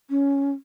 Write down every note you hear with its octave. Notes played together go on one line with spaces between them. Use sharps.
C#4